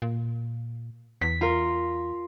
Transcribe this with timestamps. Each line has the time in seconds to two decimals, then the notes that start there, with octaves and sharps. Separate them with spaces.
0.02 A#2
1.21 E2 B6
1.41 F4 A#4